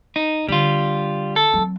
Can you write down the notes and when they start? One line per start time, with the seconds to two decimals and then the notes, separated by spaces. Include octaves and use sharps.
0.16 D#4
0.49 D3 G3 F4
1.36 A4
1.53 F#3 C4